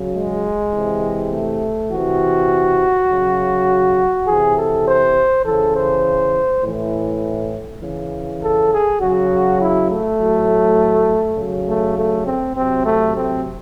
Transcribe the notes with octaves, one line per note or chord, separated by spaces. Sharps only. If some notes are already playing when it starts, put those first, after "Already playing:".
Already playing: C#3 F#3
G#3
C3 E3
A3
C3 E3 F#4
C#3 F#3
C3 E3 G#4
A4
C5
C#3 E3 A4
C5
A2 E3
C#3 E3
A4
G#4
C#3 F#3 F#4
E4
A3
A2 F#3
C#3 F#3
A3
A3
C4
C3 F#3 C4
A3
C4